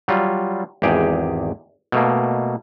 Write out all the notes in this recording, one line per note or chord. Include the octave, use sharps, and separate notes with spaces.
F#3 G3 F4
G#1 E2 G4 G#4 G5
B2 A3 A#3